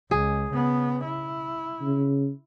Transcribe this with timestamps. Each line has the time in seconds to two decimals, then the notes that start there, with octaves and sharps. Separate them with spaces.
0.11 C#2 G#4
0.53 C#3 B3
1.05 E4
1.81 C#3